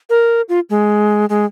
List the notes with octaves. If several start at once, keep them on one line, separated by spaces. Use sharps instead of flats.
A#4
F4
G#3
G#3